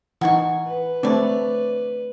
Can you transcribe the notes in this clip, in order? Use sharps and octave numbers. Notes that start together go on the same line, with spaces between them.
E3 D#4 F#5 G#5 C#6
B4
A3 C4 D4 C#5 D5